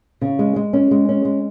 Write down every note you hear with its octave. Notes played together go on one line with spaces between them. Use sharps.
C#3
G#3
G#3
C#4
G#3
C#4
G#3